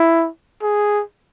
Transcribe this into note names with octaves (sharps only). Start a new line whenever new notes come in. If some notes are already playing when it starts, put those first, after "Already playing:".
Already playing: E4
G#4